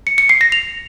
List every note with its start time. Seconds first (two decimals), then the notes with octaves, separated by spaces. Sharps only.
0.07 C#7
0.18 C#7
0.29 C7
0.41 A#6
0.52 F7